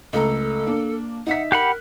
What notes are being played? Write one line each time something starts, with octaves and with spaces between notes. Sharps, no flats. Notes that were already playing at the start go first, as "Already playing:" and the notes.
C#2 A3 A4 A#5
A#3 D4
D#4 E5 F#5 B6
G4 A#4 F#5 B5 F#6